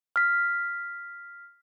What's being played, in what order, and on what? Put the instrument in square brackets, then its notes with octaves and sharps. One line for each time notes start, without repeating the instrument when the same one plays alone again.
[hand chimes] F6 B6